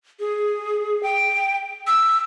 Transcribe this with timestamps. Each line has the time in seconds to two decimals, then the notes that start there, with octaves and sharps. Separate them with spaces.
0.20 G#4
1.03 G5
1.87 E6